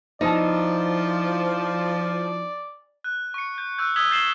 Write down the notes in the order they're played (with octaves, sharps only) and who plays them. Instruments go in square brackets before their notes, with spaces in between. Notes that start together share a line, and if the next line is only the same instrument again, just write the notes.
[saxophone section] F3 [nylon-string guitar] B3 E4 A5 [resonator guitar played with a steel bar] D#4 [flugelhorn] D5
[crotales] F#6
C#6 C#7
G6
C#6 E6 F#6 G6
D#6 E6 G#6 B6 F#7 G7
G6 A6 C7 E7 F#7 G7